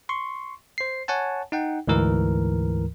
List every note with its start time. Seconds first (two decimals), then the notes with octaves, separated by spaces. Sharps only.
0.09 C6 C#6
0.78 C5 C7
1.08 C#5 F#5 G#5 A5
1.52 D#4 F#5 G5
1.87 D2 G#2 E3 A#4